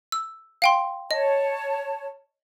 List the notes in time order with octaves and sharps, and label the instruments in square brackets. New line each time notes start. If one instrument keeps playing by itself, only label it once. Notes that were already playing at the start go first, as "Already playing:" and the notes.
[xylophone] E6
F5 G5 C6
[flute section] C#5 A5 [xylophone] D#5